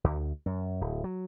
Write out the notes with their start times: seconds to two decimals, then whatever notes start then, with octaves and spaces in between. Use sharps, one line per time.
0.04 D2
0.46 F#2
0.81 D1
1.04 F#3